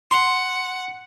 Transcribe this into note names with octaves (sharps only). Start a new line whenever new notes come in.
F#5 C6